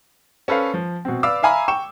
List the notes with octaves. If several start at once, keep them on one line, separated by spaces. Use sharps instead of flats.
C#4 A4 B4 C5 F5
F3
B2 C4
B4 D5 F5 D6 E6
E5 F5 G#5 A#5 B5
G5 C#6 E7